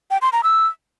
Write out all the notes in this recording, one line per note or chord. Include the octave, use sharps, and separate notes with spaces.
G5
C6
A#5
E6